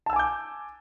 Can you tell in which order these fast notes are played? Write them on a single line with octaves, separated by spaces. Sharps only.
A5 E6 G#5 D6 G6